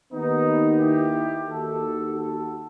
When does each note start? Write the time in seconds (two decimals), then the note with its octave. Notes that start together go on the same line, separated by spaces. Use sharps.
0.13 D#2 D#3 B3 D#4
0.80 E4 G4
1.48 D#2 D#3 F#4 A4
2.16 F#4 A4